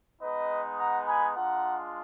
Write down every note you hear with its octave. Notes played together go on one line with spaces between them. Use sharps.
G#3 B3 D#4 B4 D#5
F#5 A#5
G#5 B5
G#3 D4 F4 F#5 A#5